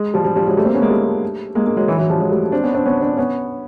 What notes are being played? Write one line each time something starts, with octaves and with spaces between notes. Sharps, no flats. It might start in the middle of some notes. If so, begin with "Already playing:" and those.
Already playing: G#3
F3 G3
F3 G3
F3 G3
F#3 G#3
G3 A3
A#3 C4
B3 C#4
G#3 A#3
G3 A3
G#3 A#3
G#3 A#3
F#3 G#3
E3 F#3
E3 F#3
F3 G3
F#3 G#3
G3 A3
C4 D4
B3 C#4
C4 D4
B3 C#4
C4 D4
B3 C#4